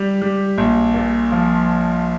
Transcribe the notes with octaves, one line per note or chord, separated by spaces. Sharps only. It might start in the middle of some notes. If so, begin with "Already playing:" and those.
Already playing: G3 G4
G3
A#1
A#2
F3